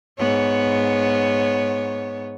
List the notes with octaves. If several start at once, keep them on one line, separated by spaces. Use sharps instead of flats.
G#2 B3 C#5